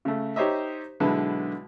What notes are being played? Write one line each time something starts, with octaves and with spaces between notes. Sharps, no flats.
C#3 A3
D#4 G4 C5 C#5 D#5 E5
B1 D3 G#3 E4 B4 A5